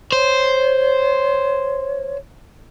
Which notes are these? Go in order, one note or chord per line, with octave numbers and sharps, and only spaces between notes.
C5 C#5